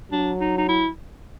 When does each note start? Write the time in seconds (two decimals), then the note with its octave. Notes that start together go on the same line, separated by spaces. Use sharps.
0.11 F#3 D4
0.40 D#4
0.58 D#4
0.68 E4